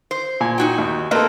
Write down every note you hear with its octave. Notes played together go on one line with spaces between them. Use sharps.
C5
A#2 G#5
D#4 F#4 G5
D#2
A#3 C4 A4 B4 D#5